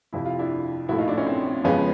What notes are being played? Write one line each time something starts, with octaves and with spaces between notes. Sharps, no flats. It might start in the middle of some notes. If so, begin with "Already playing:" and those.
F2 C3 F3 E4
F4
D4 E4
A#1 A2 F3 A3 E4 F#4
D#4 F4
D4 E4
C#4 D#4
C4
F2 C#3 F3 G#3 B3 C#4